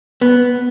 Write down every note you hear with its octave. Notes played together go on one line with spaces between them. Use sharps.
B3